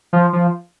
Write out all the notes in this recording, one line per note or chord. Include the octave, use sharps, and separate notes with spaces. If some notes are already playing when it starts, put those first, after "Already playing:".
F3
F3